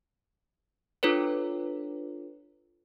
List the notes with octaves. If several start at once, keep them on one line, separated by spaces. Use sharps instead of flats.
D4 F4 A4 B4 C#5